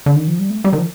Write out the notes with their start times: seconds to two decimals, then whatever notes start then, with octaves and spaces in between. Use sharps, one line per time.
0.06 D3
0.16 D#3
0.28 F3
0.39 G3
0.50 A3
0.64 G3
0.73 D#3
0.78 F3